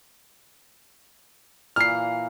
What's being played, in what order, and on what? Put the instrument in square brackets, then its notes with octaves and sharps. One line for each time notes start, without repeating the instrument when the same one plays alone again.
[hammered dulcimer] A#2 E3 A#5 [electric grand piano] F6 C7